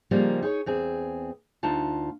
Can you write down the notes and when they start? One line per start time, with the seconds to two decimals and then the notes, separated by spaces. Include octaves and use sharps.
0.11 C#3 F3 G3 A#3 D#4
0.42 D#4 G#4 C5 C#5
0.66 E2 C4 G#4
1.63 D2 D#4 F4 A5